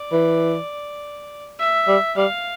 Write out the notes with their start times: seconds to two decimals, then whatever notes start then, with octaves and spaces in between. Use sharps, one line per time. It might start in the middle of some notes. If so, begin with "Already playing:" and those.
Already playing: D5
0.12 E3
1.59 E5
1.88 G3
2.17 G3 F5